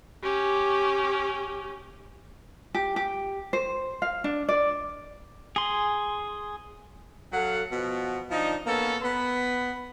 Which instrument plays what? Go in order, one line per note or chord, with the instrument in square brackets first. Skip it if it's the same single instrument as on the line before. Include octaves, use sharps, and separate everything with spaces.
[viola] C#4 G4
[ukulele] G4
G4
C5
F5
D4
D5
[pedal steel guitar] G#4 C6
[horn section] F#3 A4 F5 F#5
B2 F3 B3
F3 D4 D#4
A#3 B3 C#4 A4
B3 B5